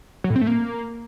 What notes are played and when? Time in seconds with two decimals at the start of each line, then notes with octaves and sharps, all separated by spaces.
0.24 F#3
0.30 A2
0.36 C4
0.41 A3
0.47 A#3